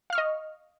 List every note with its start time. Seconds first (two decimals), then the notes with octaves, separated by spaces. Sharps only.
0.10 F5
0.13 F6
0.15 C#6
0.18 D#5